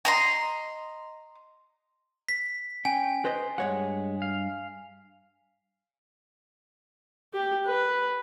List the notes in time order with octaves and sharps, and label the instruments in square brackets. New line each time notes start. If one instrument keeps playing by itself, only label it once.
[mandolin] D#5 A#5 C6
[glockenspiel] B6
[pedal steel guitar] C#4 G5 [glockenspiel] G#5
[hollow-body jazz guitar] B4 C5 D#5 [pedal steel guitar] C6
[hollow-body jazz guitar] G2 C#5 F#5 [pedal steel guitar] G#3
[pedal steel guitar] F5
[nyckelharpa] G4
B4